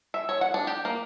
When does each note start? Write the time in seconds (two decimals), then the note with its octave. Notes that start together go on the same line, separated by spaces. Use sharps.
0.14 E5
0.29 C#5
0.41 F#5
0.54 D4
0.67 G4
0.85 A#3